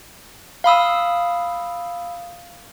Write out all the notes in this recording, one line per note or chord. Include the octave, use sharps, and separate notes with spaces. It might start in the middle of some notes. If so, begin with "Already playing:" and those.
F5 B5 D#6 E6